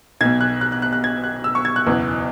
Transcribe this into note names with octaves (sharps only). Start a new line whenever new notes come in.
B1 B2 G#6
F#6
F#6
F#6
F#6
F#6
G#6
F#6
E6
C#6
G#6
F#6
F#1 E2 B2